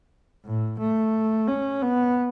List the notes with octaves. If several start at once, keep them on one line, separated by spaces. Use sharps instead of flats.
A2
A3
C#4
B3